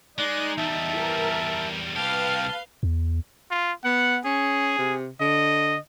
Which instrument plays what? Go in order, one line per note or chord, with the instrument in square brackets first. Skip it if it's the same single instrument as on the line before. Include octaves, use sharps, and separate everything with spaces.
[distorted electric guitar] G#3 [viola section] D#4 [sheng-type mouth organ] D5 F#6
[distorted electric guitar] E2 G3 [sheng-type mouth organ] E5 A5
[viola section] E3 A#4
[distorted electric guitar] C2 G4 [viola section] B4 F5 [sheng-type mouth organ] A5
[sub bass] E2
[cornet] F4
[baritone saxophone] B3 [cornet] F#5
[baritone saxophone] C#4 [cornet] G#4
[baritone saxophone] C3
[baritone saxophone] D3 [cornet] D#5